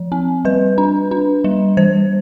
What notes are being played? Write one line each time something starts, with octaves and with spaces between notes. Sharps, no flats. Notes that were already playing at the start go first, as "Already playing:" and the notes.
Already playing: F3
C4
G3 B4
D4
D4
G3
E3 C5